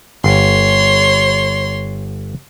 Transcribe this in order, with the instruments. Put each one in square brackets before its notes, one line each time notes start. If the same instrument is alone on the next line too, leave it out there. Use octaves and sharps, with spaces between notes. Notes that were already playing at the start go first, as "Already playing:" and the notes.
[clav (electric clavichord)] G1 [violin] C#5 C6